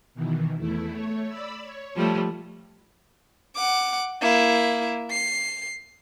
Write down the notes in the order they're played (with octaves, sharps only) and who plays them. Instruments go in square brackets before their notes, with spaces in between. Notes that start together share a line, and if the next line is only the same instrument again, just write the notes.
[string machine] B2 D#3 E3
E2 A3 E4
A3 C#5
D5 B5 E6
C#5
[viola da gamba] F3 G3 A3
[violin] F#5 D6
A#3 E4
C7